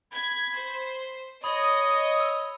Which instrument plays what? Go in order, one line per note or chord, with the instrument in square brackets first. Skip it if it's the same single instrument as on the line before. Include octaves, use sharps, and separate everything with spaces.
[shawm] B5 [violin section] G#6
[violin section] C5
[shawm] C#5 [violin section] D#5 [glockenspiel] B5 [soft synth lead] D#6
[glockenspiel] E6